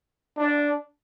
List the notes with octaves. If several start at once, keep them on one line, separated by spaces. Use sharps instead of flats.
D4